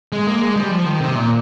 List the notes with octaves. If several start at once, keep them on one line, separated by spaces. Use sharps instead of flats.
G#3
A#3
G#3
G3
F3
D#3
C3
A#2